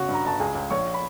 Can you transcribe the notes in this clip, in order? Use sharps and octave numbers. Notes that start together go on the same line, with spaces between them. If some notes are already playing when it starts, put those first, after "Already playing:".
Already playing: C#3 F#4 F#5
G2
A#5
G1 A5
C#2 G#4 G#5
C#2
A#1 C#5 C#6
B5